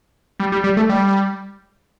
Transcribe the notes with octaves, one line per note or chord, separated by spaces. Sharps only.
G3
G3
G3
A3
G3